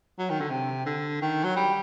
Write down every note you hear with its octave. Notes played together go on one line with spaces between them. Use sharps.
F#3
D#3
D3
C3
D3
D#3
F#3
G3